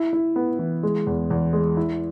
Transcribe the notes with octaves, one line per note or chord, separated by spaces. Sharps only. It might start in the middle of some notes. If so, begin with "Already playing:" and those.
Already playing: E4
E4
B3
E3
G#3
E2
E2
G#3
E4